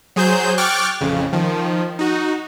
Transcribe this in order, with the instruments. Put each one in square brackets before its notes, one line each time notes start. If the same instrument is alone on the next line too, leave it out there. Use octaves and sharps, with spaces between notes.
[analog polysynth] F#3 G#4 C5 G6
G5 C#6 D6 F6 F#6 A6
A1 F2 C#3
D#3 F3
D#4 F#4